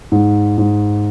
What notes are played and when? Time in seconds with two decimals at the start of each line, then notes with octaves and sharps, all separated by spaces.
0.12 G#2
0.58 G#2